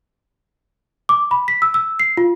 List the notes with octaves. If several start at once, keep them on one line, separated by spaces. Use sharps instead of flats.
D6
B5
B6
E6
E6
C7
F4